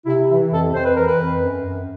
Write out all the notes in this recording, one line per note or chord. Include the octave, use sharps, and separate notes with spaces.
C3 E4
E3 E4
F2 A4
F2 C5
B4
E3 A#4
B4
F2
F#2
F#2